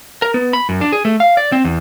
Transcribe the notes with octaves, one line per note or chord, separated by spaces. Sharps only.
A#4
B3
B5
F#2
D4
G#4
A3
F5
D5
C4
E2